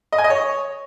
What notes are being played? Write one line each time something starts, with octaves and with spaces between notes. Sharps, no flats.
D#5
G#5
D#5
C#5